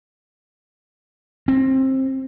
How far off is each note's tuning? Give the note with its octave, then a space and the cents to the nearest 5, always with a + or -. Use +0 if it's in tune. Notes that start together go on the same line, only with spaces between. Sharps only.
C4 +20